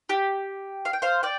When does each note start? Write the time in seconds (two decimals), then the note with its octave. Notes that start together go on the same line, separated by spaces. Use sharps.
0.09 G4
0.85 F5
0.93 G5
1.02 C5 F5
1.23 D5 G5